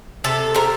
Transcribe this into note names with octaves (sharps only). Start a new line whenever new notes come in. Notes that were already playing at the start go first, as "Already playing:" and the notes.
C3 A4
C3 A#4